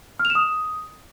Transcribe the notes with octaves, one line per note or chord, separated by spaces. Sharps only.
F6
F7
E7
D#6